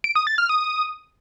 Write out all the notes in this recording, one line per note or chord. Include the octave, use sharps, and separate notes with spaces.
D7
D#6
A6
F6
D#6